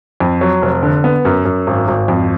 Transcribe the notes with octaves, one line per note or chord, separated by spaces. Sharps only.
F2
F#3
F1
D3
B3
F#2
F#2
G#1
G#1
F2